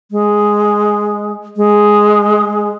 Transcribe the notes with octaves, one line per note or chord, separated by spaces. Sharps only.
G#3
G#3